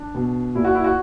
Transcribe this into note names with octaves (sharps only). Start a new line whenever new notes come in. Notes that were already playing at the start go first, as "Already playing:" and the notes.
Already playing: D4
B2
A#2 E4
F#4
E4
F#4